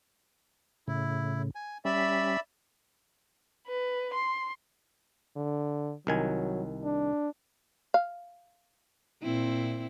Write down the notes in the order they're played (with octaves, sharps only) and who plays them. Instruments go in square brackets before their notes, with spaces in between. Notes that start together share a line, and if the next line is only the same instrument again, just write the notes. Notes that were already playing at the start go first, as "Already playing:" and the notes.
[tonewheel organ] A2 C#3 [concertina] E4
[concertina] G#5
[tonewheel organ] G3 C#4 [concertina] D5 E5 B5
[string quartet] B4
C6
[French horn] D3
[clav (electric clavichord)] C2 D#3 G#5 [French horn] F#3
[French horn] D4
[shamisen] F5
[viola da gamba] A#2 C4 E4